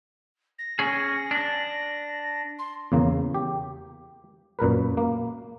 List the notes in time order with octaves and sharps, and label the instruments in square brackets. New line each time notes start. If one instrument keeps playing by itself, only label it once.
[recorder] A#6
[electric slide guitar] C#4 G#4
D4
[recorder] C6
[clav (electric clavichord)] E2 C#3 A#3
G4
F#2 A#2 A#4 B4
A#3